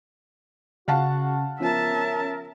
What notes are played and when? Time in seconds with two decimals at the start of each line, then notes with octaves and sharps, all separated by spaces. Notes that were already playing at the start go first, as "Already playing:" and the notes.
0.88 C#3 F#4 F5 F#5 A5
1.60 F3 B3 C#4 A#4 E5 A5